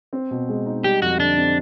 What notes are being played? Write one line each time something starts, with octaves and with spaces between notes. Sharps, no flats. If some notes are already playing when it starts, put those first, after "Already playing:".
C4
B2
G#3
D#4
G3 G4
F2 F#4
D3 D4
C4